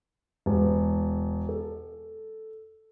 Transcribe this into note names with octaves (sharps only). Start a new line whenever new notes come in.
E1
A4